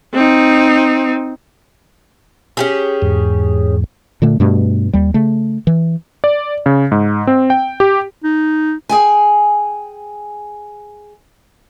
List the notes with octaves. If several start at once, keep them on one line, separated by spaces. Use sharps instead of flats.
C4 D#4
C#4 G4 G#4
E2 G#2
A#2 D3 A3
G2 B2 A3
D#2 G3
C#3 A3
E3
D5
C#3
G#2
C4
G5
G4
D#4
G#4 G5 G#5